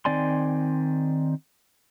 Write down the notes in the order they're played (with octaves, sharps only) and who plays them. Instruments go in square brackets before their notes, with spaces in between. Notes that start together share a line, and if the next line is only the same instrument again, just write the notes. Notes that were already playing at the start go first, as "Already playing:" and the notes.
[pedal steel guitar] D#3 C4 D5 G#5 C6